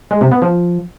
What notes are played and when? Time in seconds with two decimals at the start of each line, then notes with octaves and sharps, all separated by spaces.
0.11 G#3
0.21 C3
0.32 B3
0.42 F3